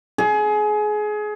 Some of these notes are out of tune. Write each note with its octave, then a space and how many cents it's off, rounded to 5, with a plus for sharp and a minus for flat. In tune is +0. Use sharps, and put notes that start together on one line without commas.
G#4 +25